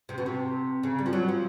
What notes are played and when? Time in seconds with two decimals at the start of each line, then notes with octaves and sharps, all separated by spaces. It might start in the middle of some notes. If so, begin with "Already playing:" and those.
0.09 C3
0.18 B2
0.26 C3
0.83 C#3
0.99 G3
1.06 F3
1.13 F#3
1.29 F3